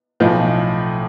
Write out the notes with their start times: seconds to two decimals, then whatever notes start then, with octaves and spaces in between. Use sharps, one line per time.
0.20 B1 A2 F3